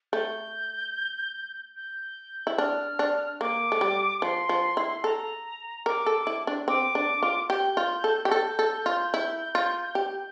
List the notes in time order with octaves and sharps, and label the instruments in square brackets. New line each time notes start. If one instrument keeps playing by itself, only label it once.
[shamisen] A3 [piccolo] G6
[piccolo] G6
[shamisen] E4
[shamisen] D4 [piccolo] F6
[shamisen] D4
[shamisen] A#3 [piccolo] D6
[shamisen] A3
G3
[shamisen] F3 [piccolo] C6
[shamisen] F3
E4
[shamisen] A4 [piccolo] A#5
[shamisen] A#4 [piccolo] D6
[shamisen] A4
E4
D4
[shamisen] C4 [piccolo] D6
[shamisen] D4
F4
[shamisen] G4 [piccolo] G6
[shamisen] F4
A4
G4
[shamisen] A4 [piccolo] G6
[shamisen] A4
F4
E4
F4
G4